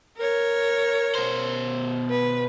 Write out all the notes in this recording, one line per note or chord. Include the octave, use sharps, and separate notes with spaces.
A#4 C#5
B2 C5
B4